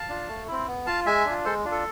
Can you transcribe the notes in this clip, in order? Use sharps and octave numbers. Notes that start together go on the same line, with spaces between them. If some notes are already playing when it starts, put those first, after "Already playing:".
Already playing: F5 A5
D4 F4
A3
C4 E4
B3
F4 F5 A5
G#3 E5 G#5
D4 F4
G#3 A4 C5
D4 F4
A4